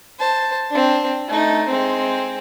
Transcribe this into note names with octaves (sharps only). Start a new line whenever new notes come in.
C5 A5
C4 D4
A3 D#4
G#3 C4